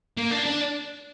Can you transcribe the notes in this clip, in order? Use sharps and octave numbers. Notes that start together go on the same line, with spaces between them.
A#3
D4
D4